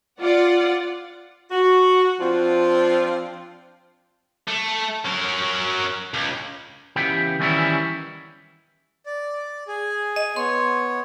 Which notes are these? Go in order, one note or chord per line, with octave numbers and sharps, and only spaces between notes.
F4 D5 F#5
F#4
F3 C4 D4 F4
A3
F#3 A#4
C#2
C#3 E3 B3 G4 G5
D#3 E3 G3 B3 C#4 E4
D5
G#4
D#5
B3 C#5 C6